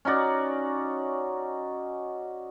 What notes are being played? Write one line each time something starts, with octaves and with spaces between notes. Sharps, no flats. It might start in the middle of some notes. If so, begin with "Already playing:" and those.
C#4 D#4 F#4 D5